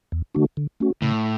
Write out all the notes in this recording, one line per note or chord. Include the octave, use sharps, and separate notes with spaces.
E2
D3 A3 D4 F#4
D3
A3 C#4 F#4
A2 C#3